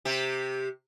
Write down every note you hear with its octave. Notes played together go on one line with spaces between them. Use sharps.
C3 G4